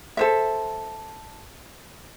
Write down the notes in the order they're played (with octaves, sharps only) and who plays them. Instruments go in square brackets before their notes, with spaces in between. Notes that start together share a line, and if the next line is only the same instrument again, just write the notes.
[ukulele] A4 C5 E5